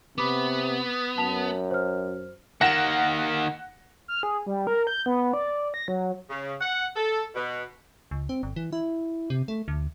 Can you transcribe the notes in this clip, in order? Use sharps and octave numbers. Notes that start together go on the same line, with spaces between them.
C3 B3 B5 D6
F#2 A5 B6 F7
C5 F6
D#3 A#3 F#5 A#6 E7
F6
G#4
G3
A#4
G6
B3
D5
A#6
F#3
C#3
F#5
A4
B2
C#2
C4
G1
E3
E4
C3
A3
D2